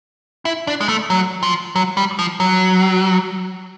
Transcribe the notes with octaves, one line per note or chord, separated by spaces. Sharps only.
E4
D4
G#3
A3
F#3
F3
F#3
G3
F3
F#3